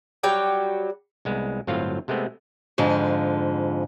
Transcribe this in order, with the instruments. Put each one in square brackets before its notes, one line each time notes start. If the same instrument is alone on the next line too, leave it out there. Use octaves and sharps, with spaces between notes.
[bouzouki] F#3 G3 G5
[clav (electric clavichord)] C2 G#3 B3
G1 A2 F#3 C4 F4 F5
C3 G#3 A3 B3 C4
[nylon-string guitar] F2 G#2 D3 F3